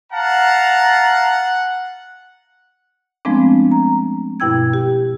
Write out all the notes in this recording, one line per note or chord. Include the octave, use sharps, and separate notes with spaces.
F5 F#5 A5 A#5
F3 G#3 A3 B3 C4 D4
A#5
G2 B2 E4 G5 E6 G#6
G4